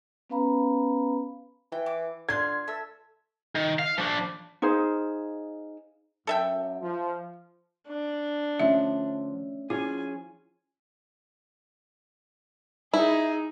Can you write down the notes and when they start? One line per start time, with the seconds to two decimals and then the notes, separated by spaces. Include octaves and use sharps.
0.30 B3 C#4 B4 F5 A#5 B5
1.72 E3 G5
1.86 D6
2.29 D3 F4 C6 G#6
2.68 A4 E5
3.55 D#3
3.79 F5
3.98 F3 D4
4.62 D#4 G#4 C5 F5
6.27 F#2 A4 E5 G5
6.81 F3
7.87 D4
8.59 D3 F3 A3 C#4 E5
9.70 F3 C#4 E4 F4 G#4 G#5
12.94 D#4 E4 G#4